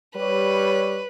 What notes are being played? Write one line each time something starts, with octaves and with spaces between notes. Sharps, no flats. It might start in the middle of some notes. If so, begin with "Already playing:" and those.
G3 B4 C#5